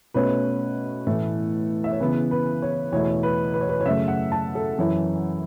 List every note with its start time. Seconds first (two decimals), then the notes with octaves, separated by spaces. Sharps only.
0.14 B2 A3 C#4 B4
1.07 A2 E3 A3
1.84 E5
1.92 C#5
2.00 C#3 E3 B3 B4
2.31 B4
2.62 C#5
2.92 E2 B2 A3 E4 C#5
3.23 B4
3.54 B4
3.61 C#5
3.69 B4
3.81 C#5
3.86 F#2 C#3 A3 E5
4.08 F#5
4.32 A5
4.55 A4
4.79 F#2 E3 C#4 E4